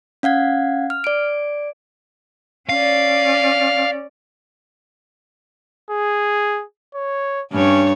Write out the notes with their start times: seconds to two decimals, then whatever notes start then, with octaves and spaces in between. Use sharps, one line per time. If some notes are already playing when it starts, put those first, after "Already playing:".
0.23 C#4 F5 F#5 G#6
0.90 F6
1.04 D5 D7
2.69 C#4 D5 F5
5.90 G#4
6.95 C#5
7.53 G2 C#4 C#5